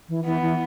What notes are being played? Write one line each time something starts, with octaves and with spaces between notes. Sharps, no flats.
E3
E3 B3
E3